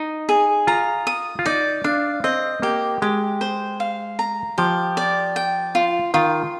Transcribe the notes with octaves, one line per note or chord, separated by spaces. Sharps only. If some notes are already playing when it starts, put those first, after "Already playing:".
Already playing: D#4
G#4
F4 A#5
D#6
F4
D#4 D5
D4 F5
C4 D#5
A#3 G4
G#3 G4
C5
F5
A#5
F3 G4
D5
G5
F4
D#3 F4